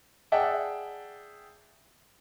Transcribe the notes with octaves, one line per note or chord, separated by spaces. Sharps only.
G#4 D5 E5 F#5 G5 A5